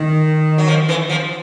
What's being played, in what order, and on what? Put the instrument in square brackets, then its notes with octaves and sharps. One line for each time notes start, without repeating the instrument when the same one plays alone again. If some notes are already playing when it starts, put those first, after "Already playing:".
Already playing: [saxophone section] D#3
[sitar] F#3
F3
E3
F3